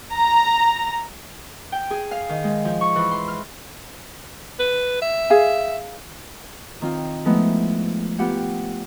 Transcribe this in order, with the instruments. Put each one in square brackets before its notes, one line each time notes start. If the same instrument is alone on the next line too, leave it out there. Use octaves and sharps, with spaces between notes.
[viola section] A#5
[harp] G5
G#4
F5
D#3
G#3
F3
C#6
E3
C6
F6
[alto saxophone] B4
E5
[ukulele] G#4 F5 G#5
[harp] D#3 C4 F4
F3 G#3 A3 B3 D#4 E4
B3 F4 G4 F#5